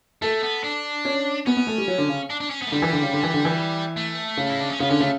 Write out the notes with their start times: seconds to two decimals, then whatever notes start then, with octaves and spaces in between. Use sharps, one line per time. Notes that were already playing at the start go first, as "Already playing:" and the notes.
0.22 A3 A4
0.42 B3
0.64 D4
1.05 C#4
1.46 B3 C#4
1.57 B3
1.67 A3
1.78 G3
1.88 F#3
1.98 D3
2.09 C#3
2.30 D4
2.41 D4
2.50 C#4
2.62 B3
2.67 A3
2.71 D3 G3
2.82 E3
2.93 D3
3.02 C#3
3.13 D3
3.23 E3
3.34 D3
3.45 E3
3.97 A3
4.37 C#3
4.50 E4
4.60 D4
4.70 C#4
4.80 C#3 B3
4.90 D3 C#4
5.00 C#3 A3